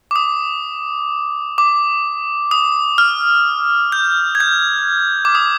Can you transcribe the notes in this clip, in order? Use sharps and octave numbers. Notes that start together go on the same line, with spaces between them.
D6
D#6
D6
D#6
F6
G6
G#6
G6
D6
D#6